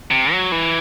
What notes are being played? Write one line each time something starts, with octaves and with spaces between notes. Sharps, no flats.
C3
F#3
E3